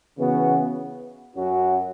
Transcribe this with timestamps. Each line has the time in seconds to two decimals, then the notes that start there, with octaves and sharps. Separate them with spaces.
0.17 C#3 E3 B3 F#4
1.35 F#2 F#3 C#4 F#4